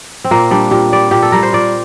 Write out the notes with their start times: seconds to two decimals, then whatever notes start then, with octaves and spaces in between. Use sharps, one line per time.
0.24 C4
0.31 A#2 A#3
0.51 G3 D4
0.71 A#2 G4
0.92 G3 D5
1.11 A#2 G4
1.22 A4
1.32 G3 A#4
1.43 C5
1.53 A#2 D5